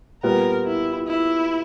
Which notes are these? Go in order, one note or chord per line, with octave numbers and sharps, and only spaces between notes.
A#2 G3 B3 A#4
E4
E4